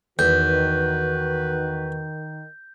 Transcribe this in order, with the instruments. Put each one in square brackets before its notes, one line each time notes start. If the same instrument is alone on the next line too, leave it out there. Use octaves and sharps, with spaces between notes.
[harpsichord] E2 [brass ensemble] D#3 [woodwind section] F#4 B4 [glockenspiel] G6